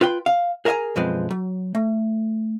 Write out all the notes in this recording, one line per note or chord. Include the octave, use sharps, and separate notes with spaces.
F4 B4 G5 C6
F5
G#4 A#4 C5 E5 G#5 A#5
B1 F#2 F3 G#3 C4 B4
F#3
A3